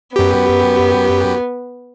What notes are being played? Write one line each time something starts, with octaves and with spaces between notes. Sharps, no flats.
F#2 B3 G4